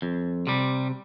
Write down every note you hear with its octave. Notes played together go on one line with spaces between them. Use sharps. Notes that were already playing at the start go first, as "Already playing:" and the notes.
F2
C3 G3